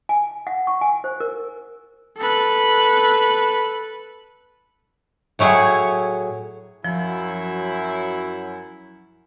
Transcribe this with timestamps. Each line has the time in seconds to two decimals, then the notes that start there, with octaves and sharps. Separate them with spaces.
0.09 G#5
0.47 F#5
0.67 C#6
0.81 G#5
1.04 C5
1.20 A#4
2.17 A4 B4
5.39 A2 F#3 E4 G#4 C#5
6.84 F#2 F3 F#3 E4